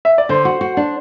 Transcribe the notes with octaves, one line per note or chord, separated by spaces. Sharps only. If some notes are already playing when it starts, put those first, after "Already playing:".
E5
D5
D3 C5
F#4
F#4
D4